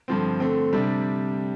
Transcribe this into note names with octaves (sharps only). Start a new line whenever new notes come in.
G2 D3 F3 C4
D3 A3 C4
C3 G3 D4